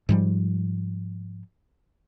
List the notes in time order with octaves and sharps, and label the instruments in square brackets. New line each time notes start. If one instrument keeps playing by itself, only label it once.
[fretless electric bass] G#2 F3 G3